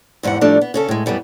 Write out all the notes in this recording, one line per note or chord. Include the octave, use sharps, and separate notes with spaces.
E2 G#2 G3 A3 F#5
A2 F3 G3 A3 D4 D#4
B3
C#3 C#4 A4
A2 G#3
F#2 G3 A3 B3